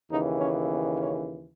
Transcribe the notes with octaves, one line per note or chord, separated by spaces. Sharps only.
D#2 C#3 E3 D#4
C#4
B3
C#4